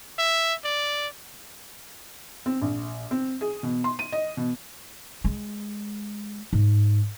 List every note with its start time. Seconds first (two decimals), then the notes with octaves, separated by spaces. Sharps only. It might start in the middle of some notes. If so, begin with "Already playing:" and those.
0.18 E5
0.65 D5
2.46 C4
2.62 A#1
3.11 C4
3.41 G#4
3.63 B2
3.84 C6
3.99 D#7
4.12 D#5
4.37 B2
5.24 G#3
6.53 G#2